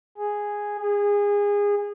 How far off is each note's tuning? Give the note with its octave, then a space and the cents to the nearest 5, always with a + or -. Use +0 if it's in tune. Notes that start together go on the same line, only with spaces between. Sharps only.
G#4 -5
G#4 -25